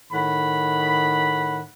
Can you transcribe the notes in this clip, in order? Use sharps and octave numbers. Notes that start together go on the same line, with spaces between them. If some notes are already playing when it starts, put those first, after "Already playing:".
A2 D#3 F#5 B5